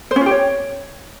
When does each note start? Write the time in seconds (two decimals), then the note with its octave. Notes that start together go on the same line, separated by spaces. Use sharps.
0.11 C5
0.16 C#4
0.21 F4
0.26 G4
0.31 C#5